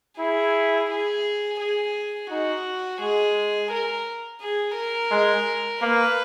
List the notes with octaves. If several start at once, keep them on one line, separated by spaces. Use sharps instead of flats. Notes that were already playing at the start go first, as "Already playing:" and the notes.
E4 G#4
G#4
G#4
D#4 F#4
G#3 G#4
A#4
G#4
A#4
G#3
A#3 B4